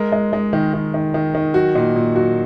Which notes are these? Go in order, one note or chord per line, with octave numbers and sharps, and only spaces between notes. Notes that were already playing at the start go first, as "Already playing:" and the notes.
Already playing: G#3 A#4
G#3
G#3
D#3
D#3
D#3
D#3
D#3
F#3 F#4
A#2 D#4
A#2
F#3 F#4